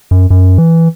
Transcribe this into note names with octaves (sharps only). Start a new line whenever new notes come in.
F#2
F#2
E3